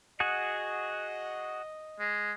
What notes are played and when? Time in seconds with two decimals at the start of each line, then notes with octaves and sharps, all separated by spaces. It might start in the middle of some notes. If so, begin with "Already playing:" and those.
0.20 F#4 G#4 D#5 F#5
2.00 G#3